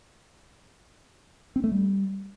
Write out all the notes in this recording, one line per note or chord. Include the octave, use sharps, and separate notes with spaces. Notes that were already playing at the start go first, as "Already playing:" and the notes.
C4
A3
G3